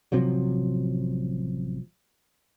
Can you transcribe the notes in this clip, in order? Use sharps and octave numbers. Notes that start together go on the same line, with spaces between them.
A1 C3 F3 F#3